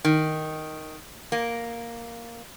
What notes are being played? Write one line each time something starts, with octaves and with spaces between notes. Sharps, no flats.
D#3
A#3